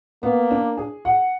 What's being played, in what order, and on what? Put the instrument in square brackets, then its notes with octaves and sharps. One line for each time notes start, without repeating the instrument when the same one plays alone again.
[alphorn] A#3 [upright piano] B3
[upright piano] D4
G#4
F#5